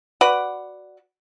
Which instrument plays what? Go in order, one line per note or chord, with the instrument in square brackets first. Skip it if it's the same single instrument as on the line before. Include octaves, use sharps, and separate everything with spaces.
[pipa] F#4 B4 D5 F#5